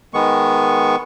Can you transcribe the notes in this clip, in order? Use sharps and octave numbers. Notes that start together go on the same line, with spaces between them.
D#3 G#3 B3 C#6